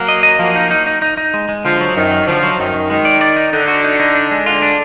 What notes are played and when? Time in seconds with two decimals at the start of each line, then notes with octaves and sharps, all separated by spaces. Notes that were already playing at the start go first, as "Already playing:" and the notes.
Already playing: F#3 A#3
0.08 D#5
0.23 D#5
0.39 F3 F#3 A#3
0.56 D#4
0.71 D#4
0.87 D#4
1.02 D#4
1.17 D#4
1.34 G#3
1.49 G#3
1.65 D3 F3
1.80 F#3
1.96 F#2 D#3
2.11 F#3
2.27 D3 F3
2.43 F#3
2.58 F#2 D#3
2.74 F#2
2.90 D#3 G#3
3.05 D5
3.21 D5
3.36 D#4
3.52 D3 D#4
3.68 F#4
3.84 D#4
4.00 D#4
4.15 D4
4.31 G#3
4.46 D3 F4
4.62 D4